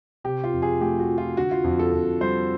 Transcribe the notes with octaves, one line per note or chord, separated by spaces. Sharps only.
C3 G4
F4
F2
G#4
A3 G4
F#4
F3
F4
D3 F#4
F4
F2
A4
F2
G3 C5